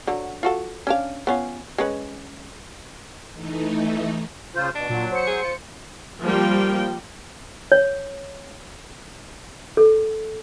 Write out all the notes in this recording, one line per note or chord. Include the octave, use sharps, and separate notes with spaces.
D3 F#3
F4 F#4 A4
C#4 D4 F5
B3 C#4 F4
G#3 C#4 B4
E3 A3 D#4
C#3 F4 C5
B2 D4
A#2 F#3
C5 C#7
G#4
F4
F3 G3 A#3 G5
C#5
A4